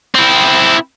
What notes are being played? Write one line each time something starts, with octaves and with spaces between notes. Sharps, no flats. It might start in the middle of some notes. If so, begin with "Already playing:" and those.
C4 E4